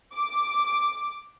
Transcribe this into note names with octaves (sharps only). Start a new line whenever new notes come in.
D6